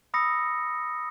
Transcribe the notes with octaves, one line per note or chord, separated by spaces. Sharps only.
B5 D#6 E6 A#6 C#7